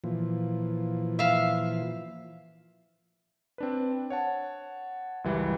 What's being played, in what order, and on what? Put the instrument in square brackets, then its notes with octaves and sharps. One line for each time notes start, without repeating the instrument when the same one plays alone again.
[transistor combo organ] A#2 E3 F3
[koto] E5 F5
[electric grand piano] C4 D4 B4
C#5 F#5 A5
C#2 F#2 E3 G3